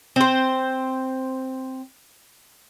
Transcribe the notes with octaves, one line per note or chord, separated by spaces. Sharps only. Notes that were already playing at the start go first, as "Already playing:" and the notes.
C4 C5